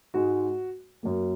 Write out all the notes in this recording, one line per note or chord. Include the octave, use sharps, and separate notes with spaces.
G#2 G#3 F#4
F#2 F#3 A#3